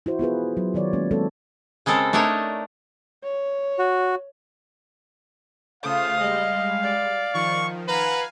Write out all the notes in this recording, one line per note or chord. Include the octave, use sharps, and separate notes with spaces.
E4 F#4 C5
B3 F4 G#4 B4
F#3
D#3 F#3 C#5 D5
G#3 A#3 C#4
F#3 G#3 B3 C4 A4 C#5
C#3 G#3 C4 A4 A#4
A3 D4 D#4 A#4 C#5
C#5
F#4
C#3 A3 F4 C5 F5 D#6
G3 G#3 D#5
D5
D#3 F3 C#6
B4 F5 F#5 G#5 A#5